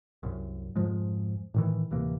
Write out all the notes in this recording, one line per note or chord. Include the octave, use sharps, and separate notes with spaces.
C2 F#2
F2 G#2 F3 G#3
A2 D#3 E3
D1 C3 E3 A#3